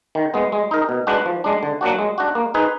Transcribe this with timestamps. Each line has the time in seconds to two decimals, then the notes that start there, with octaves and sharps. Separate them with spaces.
0.15 D#3
0.34 G#3 B3
0.52 G#3
0.71 D#4 A#4
0.89 B2
1.07 G#3 D4 F#4 B4
1.26 F3
1.44 G#3 D4
1.63 D3
1.81 F#3 A#3 D4 F#4
1.99 G#3
2.18 D4 F#4
2.35 A#3
2.54 D#4 G#4 B4